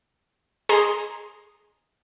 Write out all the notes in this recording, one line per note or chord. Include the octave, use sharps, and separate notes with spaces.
G#4 D#5 A#5 C6